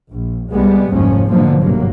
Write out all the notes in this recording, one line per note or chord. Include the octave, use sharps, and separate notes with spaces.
A#1
C2 G3 G#3 B3
F1 D#2 G#2 F3 C#4
G#2 B2 D3 F3 F#3 A#3
F1 B1 G2 F#3 A#3